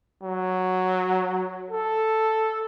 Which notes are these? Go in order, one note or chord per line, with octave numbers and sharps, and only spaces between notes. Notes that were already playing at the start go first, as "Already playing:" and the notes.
F#3
A4